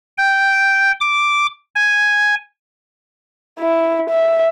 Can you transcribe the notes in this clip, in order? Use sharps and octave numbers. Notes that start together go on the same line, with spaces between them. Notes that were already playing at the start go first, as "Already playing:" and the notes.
G5
D6
G#5
E4
E5